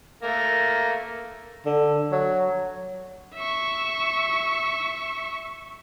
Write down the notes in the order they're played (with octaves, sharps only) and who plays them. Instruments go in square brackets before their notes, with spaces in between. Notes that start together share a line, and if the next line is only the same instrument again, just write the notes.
[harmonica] A3 A#3 A#4
[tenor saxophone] D3
F#3
[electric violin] E5 C#6